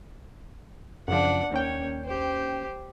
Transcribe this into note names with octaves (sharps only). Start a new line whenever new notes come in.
F#2 C#3 F3 D4 F#5
D#2 A#3 C#4 C#5 G5
G4 C5